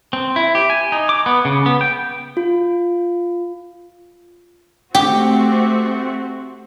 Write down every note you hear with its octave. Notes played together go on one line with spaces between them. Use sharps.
C4
E4
G4
G#5
D#4
D6
B3
C#3
B3
G5
F4
A3 C4 F#4 G4